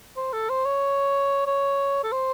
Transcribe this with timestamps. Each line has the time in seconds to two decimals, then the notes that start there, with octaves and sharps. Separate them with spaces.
0.17 C5
0.33 A4
0.50 C5
0.66 C#5
1.47 C#5
2.04 A4
2.12 C5